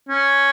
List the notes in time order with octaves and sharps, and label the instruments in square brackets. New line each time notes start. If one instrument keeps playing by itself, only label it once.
[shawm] C#4